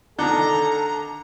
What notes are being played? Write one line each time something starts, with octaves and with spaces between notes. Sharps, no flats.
D3 D#3 A4 A#5